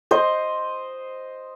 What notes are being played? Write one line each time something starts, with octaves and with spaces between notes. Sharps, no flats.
C5 D#5